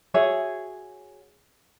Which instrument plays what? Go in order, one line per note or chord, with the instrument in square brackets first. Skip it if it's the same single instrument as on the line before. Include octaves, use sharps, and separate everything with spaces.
[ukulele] F#4 G#4 C#5 E5